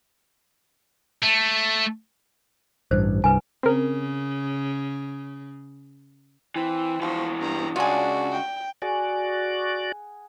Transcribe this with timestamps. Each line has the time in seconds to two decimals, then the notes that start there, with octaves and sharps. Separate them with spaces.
1.22 A3
2.91 A1 G2 C5
3.24 C2 G2 B4 G#5
3.63 C#3 C4 A#4
6.56 E3 C4
7.01 E3 F3 F#4
7.41 G2 A#5
7.76 C#2 D4 F4 F#4 G#4
8.33 G5
8.82 F#4 G#4 D5 F#5 G#5